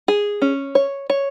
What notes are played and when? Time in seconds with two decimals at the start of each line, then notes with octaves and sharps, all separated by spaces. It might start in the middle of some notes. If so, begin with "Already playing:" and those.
0.08 G#4
0.42 C#4
0.75 C#5
1.10 C#5